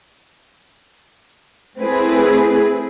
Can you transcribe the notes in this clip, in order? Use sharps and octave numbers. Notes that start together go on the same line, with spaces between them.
A3 C4 E4 G#4 B4